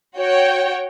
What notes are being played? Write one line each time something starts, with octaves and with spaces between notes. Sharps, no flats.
F#4 C#5 G5